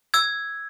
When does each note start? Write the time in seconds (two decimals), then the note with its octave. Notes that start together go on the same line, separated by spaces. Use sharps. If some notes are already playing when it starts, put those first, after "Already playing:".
0.14 E6 G#6